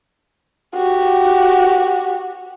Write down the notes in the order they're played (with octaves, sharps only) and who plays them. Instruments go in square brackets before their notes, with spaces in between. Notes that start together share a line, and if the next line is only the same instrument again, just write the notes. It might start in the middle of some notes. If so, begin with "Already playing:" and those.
[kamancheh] F#4 G4